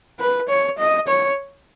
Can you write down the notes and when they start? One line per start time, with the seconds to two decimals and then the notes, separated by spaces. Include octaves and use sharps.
0.20 B4
0.49 C#5
0.78 D#5
1.07 C#5